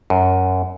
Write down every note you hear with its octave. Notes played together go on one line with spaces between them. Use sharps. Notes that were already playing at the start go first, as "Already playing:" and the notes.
F#2